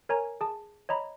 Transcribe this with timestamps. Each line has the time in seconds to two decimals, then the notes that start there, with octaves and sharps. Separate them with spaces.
0.09 A#4 C#5 G#5 A#5
0.41 G#4 A5
0.89 C#5 D#5 A#5 B5